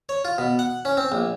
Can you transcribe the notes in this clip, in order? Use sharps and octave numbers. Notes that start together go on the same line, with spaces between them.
C#5
F4
B2
F#5
C#4
C4
A#1